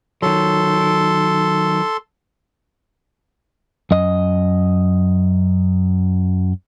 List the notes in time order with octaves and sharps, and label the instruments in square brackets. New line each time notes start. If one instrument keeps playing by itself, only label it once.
[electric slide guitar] D#3 F#3 [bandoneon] A4 C6
[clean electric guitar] F#2 D#5